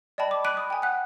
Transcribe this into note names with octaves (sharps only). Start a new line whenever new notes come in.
D5 D#5 G5 A5 B5
D6
B5 D6 F#6 D7 D#7
D#6
G5 G#5
F#5 F#6